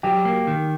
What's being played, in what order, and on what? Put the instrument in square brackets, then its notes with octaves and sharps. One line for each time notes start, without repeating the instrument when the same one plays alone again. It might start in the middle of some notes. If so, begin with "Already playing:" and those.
[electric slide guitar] F#3 [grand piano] G4
[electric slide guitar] A#3
D#3